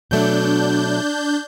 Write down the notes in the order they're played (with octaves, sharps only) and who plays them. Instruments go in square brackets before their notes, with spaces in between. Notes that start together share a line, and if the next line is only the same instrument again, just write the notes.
[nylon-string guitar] B2 F#3 A3 [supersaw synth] D4 G6